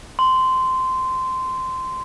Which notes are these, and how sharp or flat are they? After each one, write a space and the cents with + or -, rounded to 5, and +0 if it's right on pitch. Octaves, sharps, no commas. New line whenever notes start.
C6 -15